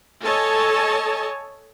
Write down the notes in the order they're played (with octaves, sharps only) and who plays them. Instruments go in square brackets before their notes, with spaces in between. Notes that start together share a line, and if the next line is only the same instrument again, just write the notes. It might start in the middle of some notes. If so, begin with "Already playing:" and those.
[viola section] A4 C#5 D#5 G#5 A5